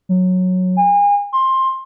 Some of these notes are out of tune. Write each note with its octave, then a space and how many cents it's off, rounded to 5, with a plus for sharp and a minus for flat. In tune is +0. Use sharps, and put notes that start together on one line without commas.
F#3 -10
G#5 -35
C6 +15